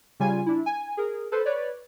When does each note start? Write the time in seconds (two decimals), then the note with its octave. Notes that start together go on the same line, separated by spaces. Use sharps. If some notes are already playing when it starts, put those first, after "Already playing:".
0.20 C#3 G3 F4 G#5
0.46 D4 E4
0.66 G#5
0.97 G#4 A#4
1.32 A4 B4 C5
1.45 B4 C#5 D5